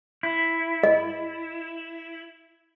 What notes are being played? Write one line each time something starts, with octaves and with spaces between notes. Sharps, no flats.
E4
D#5